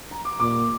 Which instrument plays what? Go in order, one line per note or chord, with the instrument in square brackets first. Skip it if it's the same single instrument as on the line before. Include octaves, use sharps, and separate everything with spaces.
[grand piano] A#5
D6
[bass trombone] A#2 [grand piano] D6